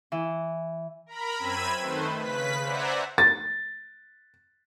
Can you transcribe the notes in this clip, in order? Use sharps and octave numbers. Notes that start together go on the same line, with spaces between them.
E3
A#4 A#5 B5
F#2 C4 B5 E6 G#6 D#7
D#3 A3 B4 C5
C#3 B4 B6
C5 D5 E5 F#5 G#5 A#5
A6